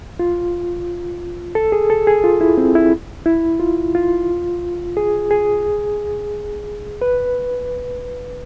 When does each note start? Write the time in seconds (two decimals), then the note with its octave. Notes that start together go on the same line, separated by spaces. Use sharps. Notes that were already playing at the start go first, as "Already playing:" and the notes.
0.19 F4
1.55 A4
1.72 G#4
1.90 A4
2.07 G#4
2.24 F4
2.41 E4
2.57 C4
2.75 E4
3.26 E4
3.60 F4
3.95 F4
4.97 G#4
5.31 G#4
7.02 B4